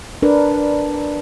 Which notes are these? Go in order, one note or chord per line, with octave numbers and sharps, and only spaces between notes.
D4 A#4 B4 D5